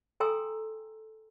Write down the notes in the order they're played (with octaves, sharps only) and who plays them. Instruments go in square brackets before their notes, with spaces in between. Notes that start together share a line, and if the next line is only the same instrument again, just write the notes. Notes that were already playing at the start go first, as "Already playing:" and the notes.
[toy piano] A4 G5 G#5 A#5 C6 E6